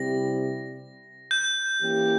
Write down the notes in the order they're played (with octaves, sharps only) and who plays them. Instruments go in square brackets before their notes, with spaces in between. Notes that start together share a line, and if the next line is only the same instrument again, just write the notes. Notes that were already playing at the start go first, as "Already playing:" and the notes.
Already playing: [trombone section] C3 G3 C4 E4 G4 [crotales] A#6
[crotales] G6
[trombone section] E3 A#3 C#4 G4